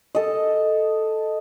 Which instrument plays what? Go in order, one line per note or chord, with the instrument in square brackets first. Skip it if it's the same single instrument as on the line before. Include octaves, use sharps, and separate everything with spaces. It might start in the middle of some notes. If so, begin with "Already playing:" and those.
[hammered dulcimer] A4 D#5